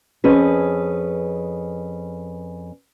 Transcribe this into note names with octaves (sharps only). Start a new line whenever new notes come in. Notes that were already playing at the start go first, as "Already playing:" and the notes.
F2 C#4 G#4 B4